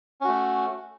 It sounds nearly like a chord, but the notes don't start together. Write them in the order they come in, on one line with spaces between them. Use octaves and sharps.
C#4 F#4 A3